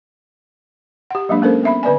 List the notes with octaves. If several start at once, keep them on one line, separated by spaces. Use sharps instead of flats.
G4 F#5
F#3 G#3 A#3 D4
A#3 C#4 A4 A#4 C5
B3 E5 B5
D3 B4 D5 G#5